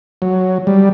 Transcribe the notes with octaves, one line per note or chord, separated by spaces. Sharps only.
F#3
G3